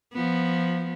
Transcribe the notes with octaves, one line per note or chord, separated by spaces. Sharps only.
F3 B3